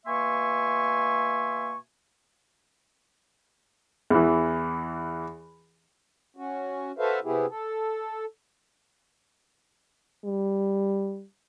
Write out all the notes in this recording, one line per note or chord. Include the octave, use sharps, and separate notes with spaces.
B2 A#3 E5 G#5 C6 C#6
E2 E3
C#4 F#4
F#4 A4 B4 C5 E5 F5
C3 B3 E4 G4 G#4
A4
G3